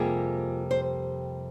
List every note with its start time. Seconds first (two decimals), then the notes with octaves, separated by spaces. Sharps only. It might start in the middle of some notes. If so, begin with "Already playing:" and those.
Already playing: F2 C3 G3 A#3 F4 G#4
0.71 C5